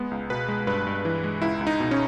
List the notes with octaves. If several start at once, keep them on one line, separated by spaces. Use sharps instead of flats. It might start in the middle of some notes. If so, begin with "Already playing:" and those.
Already playing: G#3 B3
C#2
B2 B4
G#3
G2 B4
G2
E3
G#3
C#2 E4
C#2
D#4
B2
C#4